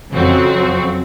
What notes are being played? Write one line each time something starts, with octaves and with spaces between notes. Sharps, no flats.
F2 C#3 F#3 C4 F#4